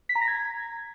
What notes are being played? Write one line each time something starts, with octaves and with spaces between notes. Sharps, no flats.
B6
A#5
A#6
G#6